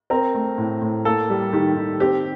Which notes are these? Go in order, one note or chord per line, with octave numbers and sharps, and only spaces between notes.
C4 A#4
A3
A2
A2
A#3 A4
G3
D#3 G4
D#3
C4 G4